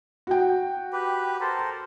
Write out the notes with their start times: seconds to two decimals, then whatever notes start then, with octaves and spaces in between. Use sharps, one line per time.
0.27 F#4 G5
0.93 G4 B4
1.41 A4 A#4 C5